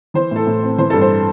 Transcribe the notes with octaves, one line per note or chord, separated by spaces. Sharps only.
E3 C5
A2 A4
A2
C4
E3 C5
G2 A4
C5